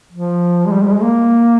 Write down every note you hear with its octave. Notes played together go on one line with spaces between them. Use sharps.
F3
G#3
G3
G#3
G3
G#3
A#3